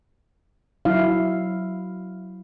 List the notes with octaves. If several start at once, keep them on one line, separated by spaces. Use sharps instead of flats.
F#3 E4 F5